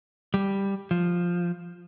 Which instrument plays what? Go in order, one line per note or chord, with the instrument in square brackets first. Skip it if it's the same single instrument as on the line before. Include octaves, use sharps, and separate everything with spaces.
[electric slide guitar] G3
F3